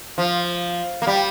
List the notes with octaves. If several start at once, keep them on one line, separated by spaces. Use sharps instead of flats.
F3
A#3
G3